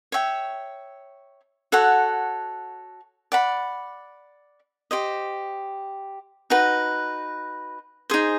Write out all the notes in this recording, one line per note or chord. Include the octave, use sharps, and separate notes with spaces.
C#5 E5 G5
F#4 A4 C#5 F#5
D5 F#5 B5
G4 C5 D#5
D#4 F#4 B4
D#4 G#4 C5